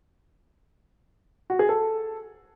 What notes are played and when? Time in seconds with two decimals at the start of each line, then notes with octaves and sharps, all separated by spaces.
1.50 F#4
1.59 G#4
1.69 A4